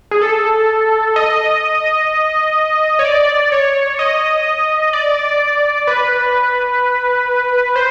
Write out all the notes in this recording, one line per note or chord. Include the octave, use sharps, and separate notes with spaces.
G#4
A4
D#5
C#5
D5
C#5
D#5
D5
B4
C5